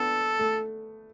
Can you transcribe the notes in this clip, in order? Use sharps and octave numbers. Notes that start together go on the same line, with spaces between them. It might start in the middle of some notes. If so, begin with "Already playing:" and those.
Already playing: B3 D4 A4
A3